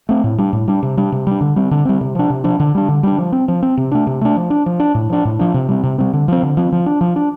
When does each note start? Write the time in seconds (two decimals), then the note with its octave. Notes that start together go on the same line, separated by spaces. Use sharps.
0.09 A3 C4
0.24 A2
0.38 G3 D4
0.53 A2
0.68 G3 D4
0.83 C3
0.97 G3 D4
1.12 C3
1.27 G3 D4
1.41 D3
1.56 G3 C4
1.71 D3
1.85 G3 C4
2.01 C3
2.15 F3 D4
2.30 C3
2.44 F3 D4
2.60 D3
2.75 G3 D4
2.89 D3
3.03 G3 D4
3.18 F3
3.32 C4
3.48 F3
3.63 C4
3.77 C3
3.92 A3 D4
4.07 C3
4.21 A3 D4
4.36 F3
4.50 D4
4.66 F3
4.80 D4
4.95 A2
5.09 F3 D4
5.25 A2
5.39 F3 D4
5.54 C3
5.69 G3 C4
5.83 C3
5.98 G3 C4
6.13 D3
6.28 F3 C4
6.43 D3
6.57 F3 C4
6.72 F3
6.86 D4
7.01 F3
7.16 D4